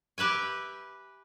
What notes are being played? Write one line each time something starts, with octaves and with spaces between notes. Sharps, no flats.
G4 B4 E5 G#5